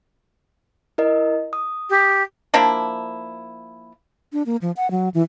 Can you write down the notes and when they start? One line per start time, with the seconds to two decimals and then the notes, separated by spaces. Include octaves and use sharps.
0.98 E4 A#4 D#5
1.53 D#6
1.90 G4
2.54 F3 A#3 D4 E4
4.33 D4
4.46 A#3
4.62 F3
4.77 F#5
4.91 F#3
5.14 E3